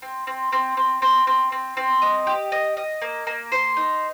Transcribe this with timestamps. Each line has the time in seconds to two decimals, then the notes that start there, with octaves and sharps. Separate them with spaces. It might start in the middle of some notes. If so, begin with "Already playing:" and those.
0.02 C4
0.27 C4
0.52 C4
0.77 C4
1.02 C4
1.27 C4
1.52 C4
1.77 C4
2.02 D#5
2.27 G4
2.52 D#5
2.77 D#5
3.02 A#3
3.27 A#3
3.52 C5
3.77 D#4